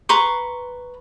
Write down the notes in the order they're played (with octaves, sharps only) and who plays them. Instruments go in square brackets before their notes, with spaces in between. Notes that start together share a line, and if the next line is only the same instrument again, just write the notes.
[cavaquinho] B4 A#5 C6 C#6